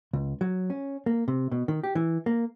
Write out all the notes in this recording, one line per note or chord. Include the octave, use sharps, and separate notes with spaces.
C#2
F#3
C#4
A#3
C3
B2
D#3
G4
E3
A#3